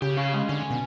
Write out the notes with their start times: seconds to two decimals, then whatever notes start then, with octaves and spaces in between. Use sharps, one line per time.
0.02 C#3 G4
0.17 C#4 F5
0.33 G#3
0.49 D3 C#4
0.70 B2